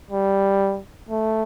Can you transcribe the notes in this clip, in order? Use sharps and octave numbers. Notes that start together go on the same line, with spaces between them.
G3
A3